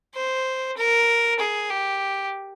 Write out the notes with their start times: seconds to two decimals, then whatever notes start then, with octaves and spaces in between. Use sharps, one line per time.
0.15 C5
0.77 A#4
1.39 G#4
1.70 G4